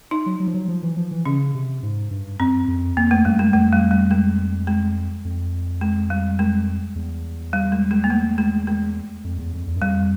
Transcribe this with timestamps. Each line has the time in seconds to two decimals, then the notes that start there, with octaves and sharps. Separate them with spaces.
0.11 D#4
0.26 F#3
0.40 F#3
0.47 F3
0.54 F#3
0.68 F3
0.82 E3
0.96 F3
1.11 E3
1.25 C#3 C#4
1.54 C3
1.83 G#2
2.11 G2
2.39 F#2 C4
2.68 F2
2.97 F2 A#3
3.11 A3
3.25 F#2 G3
3.39 G#3
3.53 F2 A3
3.73 G3
3.91 G3
4.11 G#3
4.67 G#3
5.25 F2
5.81 G#3
6.10 G3
6.39 G#3
6.95 E2
7.53 G3
7.72 G#3
7.91 G#3
8.04 A#3
8.10 A3
8.38 G#3
8.67 G#3
9.24 F2
9.39 E2
9.53 F2
9.67 E2
9.76 F#2
9.81 F2 G3